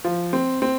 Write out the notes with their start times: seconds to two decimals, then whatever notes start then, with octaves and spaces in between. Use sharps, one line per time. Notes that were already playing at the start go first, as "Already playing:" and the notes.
0.05 F3
0.33 C4
0.62 C4